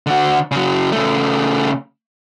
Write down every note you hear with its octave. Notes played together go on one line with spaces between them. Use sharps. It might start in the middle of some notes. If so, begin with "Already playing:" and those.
D3 F#4
C#3 F#3
C#3 A3